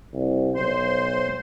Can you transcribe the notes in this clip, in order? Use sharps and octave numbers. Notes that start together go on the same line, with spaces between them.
C2
B1 C5 C6